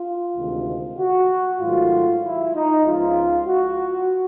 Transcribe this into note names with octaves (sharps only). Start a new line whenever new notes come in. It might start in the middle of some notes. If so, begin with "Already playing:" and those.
Already playing: F4
D2 C3 D#3 G#3
F#4
G#2 D#3 F#3 A3 F4
E4
D#4
C#2 C#3 F3 G#3 F4
F#4